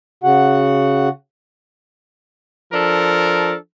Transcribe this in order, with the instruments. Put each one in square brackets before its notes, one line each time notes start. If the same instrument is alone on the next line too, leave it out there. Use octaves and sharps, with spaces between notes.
[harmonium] C#3 F#4 F#5
[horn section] F3 D4 A4 A#4